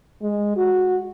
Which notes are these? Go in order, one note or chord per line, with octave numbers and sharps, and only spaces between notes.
G#3
F#4